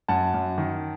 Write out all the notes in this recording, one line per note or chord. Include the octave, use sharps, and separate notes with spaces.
F#2 F#5 A5
F#2
D#3